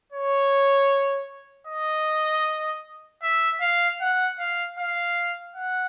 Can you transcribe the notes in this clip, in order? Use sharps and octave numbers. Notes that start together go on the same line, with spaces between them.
C#5
D#5
E5
F5
F#5
F5
F5
F#5